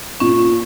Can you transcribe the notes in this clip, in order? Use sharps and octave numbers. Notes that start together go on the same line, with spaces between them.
A#2 C#4